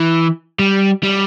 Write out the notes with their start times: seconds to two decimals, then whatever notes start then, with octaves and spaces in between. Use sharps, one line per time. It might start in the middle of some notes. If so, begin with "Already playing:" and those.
Already playing: E3
0.59 G3
1.03 G3